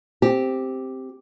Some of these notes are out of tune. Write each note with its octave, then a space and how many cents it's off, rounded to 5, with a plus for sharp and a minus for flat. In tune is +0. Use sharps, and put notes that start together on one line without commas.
C4 +0 G4 +0